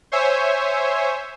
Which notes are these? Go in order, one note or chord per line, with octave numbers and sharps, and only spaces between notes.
C5 C#5 E5 G#5